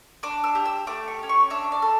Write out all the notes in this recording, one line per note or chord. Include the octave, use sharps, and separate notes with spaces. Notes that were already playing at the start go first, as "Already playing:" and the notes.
D4 D6
E6
G4
E6
A3 D6
C#6
C#4 G4
C#6
D4 E5
D5
A4